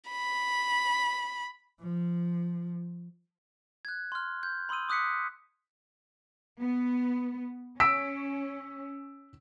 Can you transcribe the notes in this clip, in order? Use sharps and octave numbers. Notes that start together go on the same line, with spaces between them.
B5
F3
F#6 G#6
C6 F6
G6
B5 C6 D#6 E6 D#7
D6 D#6 F#6 B6 C#7
B3
C#4 E6 B6 D7